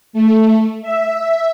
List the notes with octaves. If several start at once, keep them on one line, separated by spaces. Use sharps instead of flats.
A3
E5